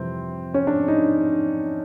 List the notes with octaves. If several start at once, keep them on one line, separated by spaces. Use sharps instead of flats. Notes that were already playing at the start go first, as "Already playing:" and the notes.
Already playing: F2 C3 E3 G3 C4
C#4
D4
D#4